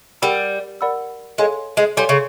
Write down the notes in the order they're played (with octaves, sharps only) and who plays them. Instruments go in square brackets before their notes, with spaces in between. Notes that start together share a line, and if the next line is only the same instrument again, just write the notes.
[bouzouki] G3 [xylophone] A#4 D5 F#5 B5 E6
[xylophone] A#4 D5 F#5 B5 E6
[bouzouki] G#3 [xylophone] A4 C#5 F5 G#5 C6
[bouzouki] G#3
[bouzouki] G3 [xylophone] A4 C#5 F5 G#5 C6
[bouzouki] C#3